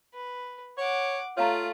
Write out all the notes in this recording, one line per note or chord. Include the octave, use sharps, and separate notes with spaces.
B4
C#5 F#5 D6
A3 F4 C#5 F5 A#5